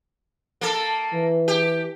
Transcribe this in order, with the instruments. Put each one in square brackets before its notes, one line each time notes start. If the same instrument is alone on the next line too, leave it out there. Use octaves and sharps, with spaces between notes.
[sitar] A#3 A4
[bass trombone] E3
[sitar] G4